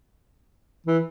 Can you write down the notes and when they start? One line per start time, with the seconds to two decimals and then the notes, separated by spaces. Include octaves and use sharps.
0.87 E3